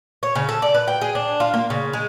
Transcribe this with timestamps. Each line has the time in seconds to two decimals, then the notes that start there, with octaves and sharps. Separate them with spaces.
0.23 C#5
0.35 C#3
0.49 A4
0.62 D5
0.75 B4
0.88 G5
1.01 G#4
1.15 D4
1.40 F4
1.54 A#3
1.70 C#3
1.93 G#3